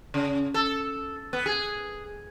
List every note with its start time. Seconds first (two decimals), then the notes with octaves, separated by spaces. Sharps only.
0.14 C#3
0.54 A4
1.33 B3
1.46 G#4